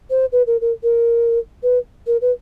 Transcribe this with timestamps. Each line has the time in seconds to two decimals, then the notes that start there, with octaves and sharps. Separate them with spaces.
0.10 C5
0.32 B4
0.47 A#4
0.61 A#4
0.83 A#4
1.63 B4
2.07 A#4
2.22 B4